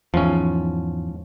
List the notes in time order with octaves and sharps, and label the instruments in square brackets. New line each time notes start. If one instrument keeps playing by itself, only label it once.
[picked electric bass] E2 G#2 [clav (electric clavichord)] F3 C#4